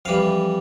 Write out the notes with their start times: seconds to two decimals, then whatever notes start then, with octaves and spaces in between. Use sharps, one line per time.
0.05 F2 E3 G3 F5